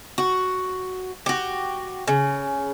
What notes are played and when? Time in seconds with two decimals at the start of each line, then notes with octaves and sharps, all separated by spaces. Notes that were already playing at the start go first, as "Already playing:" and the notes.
0.18 F#4
1.26 F#4 G4
2.07 C#3